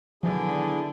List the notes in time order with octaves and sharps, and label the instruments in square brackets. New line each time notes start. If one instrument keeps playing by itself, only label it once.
[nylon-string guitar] B2 D#3 F#3 [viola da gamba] D3 [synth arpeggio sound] F3 [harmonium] D4 E4 G#4